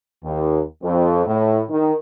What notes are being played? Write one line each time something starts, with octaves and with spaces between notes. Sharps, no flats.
D#2
F2
A2
D#3